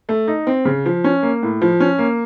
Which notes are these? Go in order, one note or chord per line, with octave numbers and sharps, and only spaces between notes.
A3
D#4
C4
C#3
F3
C#4
A#3
A2
F3
C#4
A#3